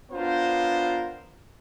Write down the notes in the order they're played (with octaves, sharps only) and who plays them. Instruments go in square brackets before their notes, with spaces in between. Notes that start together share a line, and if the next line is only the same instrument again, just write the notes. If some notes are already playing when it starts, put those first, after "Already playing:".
[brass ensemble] B3 D4 F4 A#4 C5